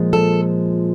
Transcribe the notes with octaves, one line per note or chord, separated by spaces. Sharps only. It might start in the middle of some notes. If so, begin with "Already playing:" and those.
Already playing: A#2 F3 G#3
A4